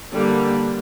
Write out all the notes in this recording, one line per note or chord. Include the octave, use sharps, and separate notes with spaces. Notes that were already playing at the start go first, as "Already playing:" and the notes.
D3 G3 A#3